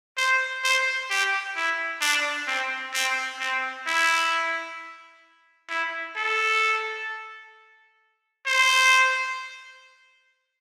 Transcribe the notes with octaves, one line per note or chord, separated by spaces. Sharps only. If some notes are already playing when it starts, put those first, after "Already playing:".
C5
C5
G4
E4
D4
C4
C4
C4
E4
E4
A4
C5